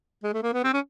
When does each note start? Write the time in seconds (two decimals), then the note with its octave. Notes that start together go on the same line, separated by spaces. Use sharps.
0.23 G#3
0.33 A3
0.43 A#3
0.53 B3
0.63 C4
0.73 C#4